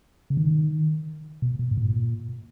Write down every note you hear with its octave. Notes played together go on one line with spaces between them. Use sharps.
C#3
D#3
B2
B2
G#2
A#2